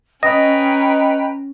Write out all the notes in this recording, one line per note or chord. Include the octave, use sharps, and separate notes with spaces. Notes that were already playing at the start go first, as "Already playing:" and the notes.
C#4 B4 D#5 G5 A#5 A#6